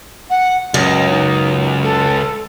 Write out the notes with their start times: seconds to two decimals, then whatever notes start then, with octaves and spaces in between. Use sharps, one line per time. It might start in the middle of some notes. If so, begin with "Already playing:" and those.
0.30 F#5
0.74 C#2 F#2 D#5
1.10 D#4
1.83 A4